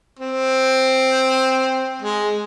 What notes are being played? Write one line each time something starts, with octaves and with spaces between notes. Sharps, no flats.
C4
G#3